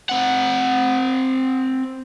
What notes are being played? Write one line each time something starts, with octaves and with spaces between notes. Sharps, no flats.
C4 F#5